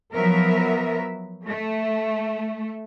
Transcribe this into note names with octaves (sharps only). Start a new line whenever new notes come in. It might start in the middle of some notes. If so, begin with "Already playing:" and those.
F3 F#3 B3 A#4 E5
A3